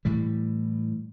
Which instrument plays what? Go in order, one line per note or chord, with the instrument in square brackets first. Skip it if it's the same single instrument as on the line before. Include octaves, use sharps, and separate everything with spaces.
[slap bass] A2 E3 G3